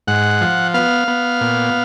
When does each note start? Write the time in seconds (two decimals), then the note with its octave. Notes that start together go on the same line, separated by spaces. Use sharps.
0.08 G#2 F#5
0.41 F3
0.74 B3 F5
1.08 B3
1.41 A#2